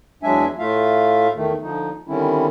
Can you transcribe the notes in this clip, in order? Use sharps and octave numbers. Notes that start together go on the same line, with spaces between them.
E2 F#3 G#3 D4 E5 G#5
A2 A3 F4 E5 F5
E2 D#3 A3
D3 F3 D#4
D3 D#3 G3 C4 C#4 E4